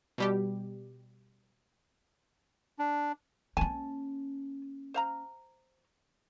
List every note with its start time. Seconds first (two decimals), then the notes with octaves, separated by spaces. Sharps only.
0.18 B2 G3 G4
2.79 D4
3.57 A#3 C#4 G#5 A5
4.94 C5 F5 A#5